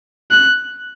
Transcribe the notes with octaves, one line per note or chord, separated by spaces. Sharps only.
F#6